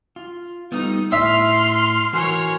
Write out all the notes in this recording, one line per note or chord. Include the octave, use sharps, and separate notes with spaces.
F4
G3 A3 B3 D#4
A2 E5 C6 F6
E3 F#4 A#4 C#5 G#5